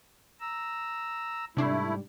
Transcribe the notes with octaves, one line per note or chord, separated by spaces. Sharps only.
A#5 E6
G#2 C3 G3 A3 D4 E4 C7